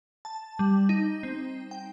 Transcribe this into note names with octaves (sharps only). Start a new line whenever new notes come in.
A5
G3
D#4
C4
G5